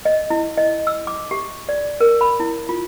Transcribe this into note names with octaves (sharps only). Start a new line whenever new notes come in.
D#5
E4
D#5
E6
D6
G4
D5
A#4
B5
E4
F4